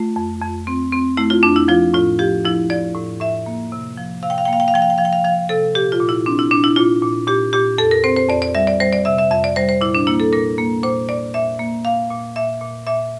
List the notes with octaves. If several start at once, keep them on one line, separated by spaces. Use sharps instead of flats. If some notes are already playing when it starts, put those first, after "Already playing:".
Already playing: A3 F4
F2
F2
C4
C4
A3 E4
F4
F2 D4
E4
F3 F4
A2 F4
F3 G4
F3 E4
F3 D5
A2
A2 E5
A#3
C3
F3
C3 F5
G5
F5
G5
A#3 F5
G5
F5
F3 G5
F5
G5
F3 F5
G5
F5
F3 F5
C3 A4
A#2 G4
F4
A#2
E4
C4 D4
E4
A#2 D4
E4
A#2 F4
A#2
A#2 G4
A#2 G4
F2 A4
A#4
C4 C5
C5
F2 D5
D5
G3 E5
D5
G3 C5
D5
C3 E5
E5
F2 E5
D5
G3 C5
C5
A#2 E4
D4
A#3 E4
A4
A#2 A#4
A#3
A#2 C5
A#2 D5
A#2 E5
A#3
A#2 F5
A#2
A#2 E5
A#2
A#2 E5